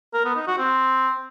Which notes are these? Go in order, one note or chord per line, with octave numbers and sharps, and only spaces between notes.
A#4
B3
D#4
F#4
C4